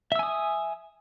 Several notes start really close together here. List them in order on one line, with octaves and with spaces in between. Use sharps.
E5 E6 G#5 D#6